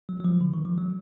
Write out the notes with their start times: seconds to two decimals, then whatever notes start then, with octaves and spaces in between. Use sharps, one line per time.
0.09 F#3
0.20 F#3
0.24 F3
0.41 D3
0.54 D#3
0.65 F3
0.78 F#3